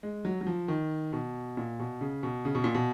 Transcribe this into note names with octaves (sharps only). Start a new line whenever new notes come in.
G#3
F#3
F#3
F3
D#3
B2
A#2
B2
C#3
B2
C#3
B2
A#2
B2